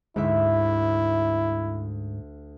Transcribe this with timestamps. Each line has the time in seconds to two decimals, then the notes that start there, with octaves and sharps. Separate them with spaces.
0.16 D2 G#2 E4 G4 E5